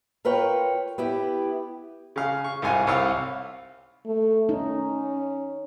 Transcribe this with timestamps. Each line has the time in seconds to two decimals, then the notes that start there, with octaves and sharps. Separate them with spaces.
0.25 F4 A#4 B4 C#5 G5
0.98 B3 E4 G4 G5
2.16 C#3 F5
2.44 C#6
2.62 C2 G#2 F5 G#5
2.87 C2 C#5 F5 E6
4.06 A3
4.49 C#4 D#4